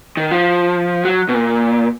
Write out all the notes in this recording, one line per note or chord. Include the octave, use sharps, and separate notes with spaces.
D#3
F3
F#3
B2
A#2